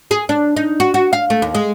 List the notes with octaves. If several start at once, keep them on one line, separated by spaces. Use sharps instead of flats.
G#4
D4
D#4
F#4
F#4
F5
A3
D#2
G#3